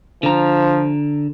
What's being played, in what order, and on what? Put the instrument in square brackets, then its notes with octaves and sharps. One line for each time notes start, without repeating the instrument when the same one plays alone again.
[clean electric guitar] D3 A#5 [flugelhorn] F3